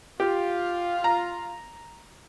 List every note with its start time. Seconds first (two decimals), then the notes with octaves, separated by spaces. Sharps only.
0.20 F4 G4
1.04 A#5